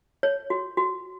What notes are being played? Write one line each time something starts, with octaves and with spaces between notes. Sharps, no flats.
C#5
F#4
F#4